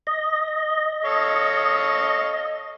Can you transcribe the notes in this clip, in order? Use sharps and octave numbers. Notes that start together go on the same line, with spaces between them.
D#5
A4 C#5 F5